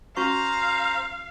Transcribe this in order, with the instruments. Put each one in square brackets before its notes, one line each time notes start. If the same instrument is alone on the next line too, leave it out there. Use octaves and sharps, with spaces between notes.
[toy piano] C#4 F#4 C#6 [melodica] C5 A#5 [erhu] F5